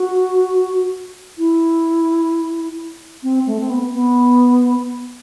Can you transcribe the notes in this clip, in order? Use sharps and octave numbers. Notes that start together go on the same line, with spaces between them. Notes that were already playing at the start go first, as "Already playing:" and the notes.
Already playing: F#4
E4
C4
A3
C4
B3
B3